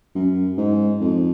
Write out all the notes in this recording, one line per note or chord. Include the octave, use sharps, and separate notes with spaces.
F#2
G#2
F2